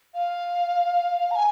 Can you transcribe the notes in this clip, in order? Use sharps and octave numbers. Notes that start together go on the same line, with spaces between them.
F5
A#5
G#5